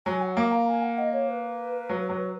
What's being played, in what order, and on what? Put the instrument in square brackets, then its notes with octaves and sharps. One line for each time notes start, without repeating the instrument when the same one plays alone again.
[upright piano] F#3 [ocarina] G#5
[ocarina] F#5
[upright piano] A#3 [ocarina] F5
[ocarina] A#5
G#5
F#5
D#5
C#5
B4
[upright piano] F#3
F#3